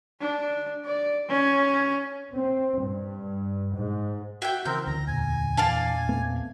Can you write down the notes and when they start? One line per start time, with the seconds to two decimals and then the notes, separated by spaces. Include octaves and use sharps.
0.20 D4
0.85 D5
1.28 C#4
2.35 C4
2.80 G2
3.74 G#2
4.42 F#4 E5 F#5 G5 G6
4.66 C#3 E3 C4 A#4 G6
4.87 D2 A#5
5.08 E2 A#2 G#5
5.57 E3 D4 D5 F5 A5
6.09 A3 B3 C4